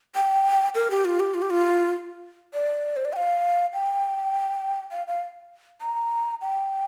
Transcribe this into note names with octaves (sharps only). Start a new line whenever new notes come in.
G5
A#4
G4
F4
G4
F4
G4
F4
D5
C5
D5
G5
F5
G5
F5
F5
A#5
G5